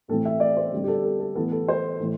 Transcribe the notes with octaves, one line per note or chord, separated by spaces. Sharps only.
A2 E3 A3 C4 A4
E5
D5
C5
D3 G3 C4 G4
G4
A4
A4
A4
A2 E3 B3 A4
A4
C5
A2 E3